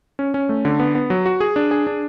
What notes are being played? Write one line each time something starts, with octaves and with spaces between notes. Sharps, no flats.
C#4
C#4
A3
D3
B3
B3
F#3
F#4
G#4
D4
G#4
D4